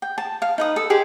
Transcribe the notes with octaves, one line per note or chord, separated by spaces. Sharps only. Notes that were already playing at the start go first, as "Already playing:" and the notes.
G5
A5
F5
D#4 B4 D#6
A4
G4 G#4 C5